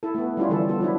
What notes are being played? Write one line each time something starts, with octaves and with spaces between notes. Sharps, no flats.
E4 A4
A3 B3
G3 C#4 E4 F4
D3 E3 F3 G3 A4
B3 F4 A4
F3 F#3 D4 E4